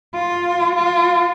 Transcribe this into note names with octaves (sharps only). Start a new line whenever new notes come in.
F4
F4